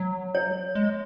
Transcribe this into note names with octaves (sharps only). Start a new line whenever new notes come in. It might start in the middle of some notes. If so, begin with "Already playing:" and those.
Already playing: F#3
C#5
G#3